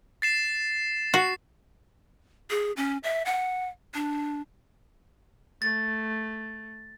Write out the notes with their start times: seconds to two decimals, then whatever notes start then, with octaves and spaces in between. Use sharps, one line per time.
0.22 A6 C7 E7
1.14 F#4 C7
2.50 G#4
2.77 C#4
3.03 E5
3.26 F#5
3.94 D4
5.62 A3 A6